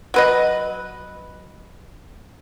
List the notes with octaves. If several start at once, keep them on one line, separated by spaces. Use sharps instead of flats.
F#3 B4 D#5